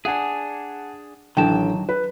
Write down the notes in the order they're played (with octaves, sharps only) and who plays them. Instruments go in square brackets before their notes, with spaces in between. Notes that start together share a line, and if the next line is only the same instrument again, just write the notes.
[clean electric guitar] D4 G#4 [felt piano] F#5 G#5
[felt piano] A1 D3 G5 [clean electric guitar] D#3 F#3 A5
[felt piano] B4